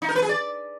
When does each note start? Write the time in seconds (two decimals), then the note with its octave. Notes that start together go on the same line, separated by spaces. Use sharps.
0.02 D#4
0.09 A#4
0.15 B4
0.22 G#4
0.29 D5